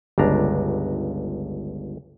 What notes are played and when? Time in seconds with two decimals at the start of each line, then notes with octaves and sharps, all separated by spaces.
0.18 G1 C#2 D4 A#5